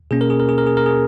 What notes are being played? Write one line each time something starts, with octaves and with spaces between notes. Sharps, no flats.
B2 A#3 C#4 G#4
A#4
G#4
A#4
G#4
A#4
G#4
A#4
G#4